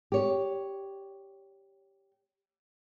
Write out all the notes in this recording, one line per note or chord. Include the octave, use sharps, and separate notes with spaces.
G4 C#5